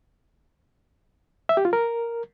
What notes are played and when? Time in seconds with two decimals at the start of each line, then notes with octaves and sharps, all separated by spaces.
1.49 E5
1.57 G4
1.65 F4
1.73 A#4